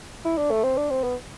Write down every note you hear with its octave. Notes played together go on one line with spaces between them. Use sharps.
E4
D4
A3
C4
D4
C4
B3